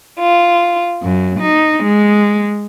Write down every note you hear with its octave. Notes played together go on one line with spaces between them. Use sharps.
F4
F#2
D#4
G#3